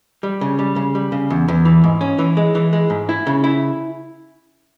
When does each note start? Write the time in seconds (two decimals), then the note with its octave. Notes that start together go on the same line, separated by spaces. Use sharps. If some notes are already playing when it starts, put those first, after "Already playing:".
0.23 G3
0.41 C#3
0.59 G3
0.76 C#3
0.95 G3
1.12 C#3
1.30 E2
1.48 E2
1.65 E3
1.84 G#2
2.01 C#4
2.19 E3
2.37 G#3
2.55 E3
2.73 G#3
2.90 G#2
3.09 E4
3.27 C#3
3.44 E4